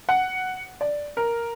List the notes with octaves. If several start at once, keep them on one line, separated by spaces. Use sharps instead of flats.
F#5
D5
A#4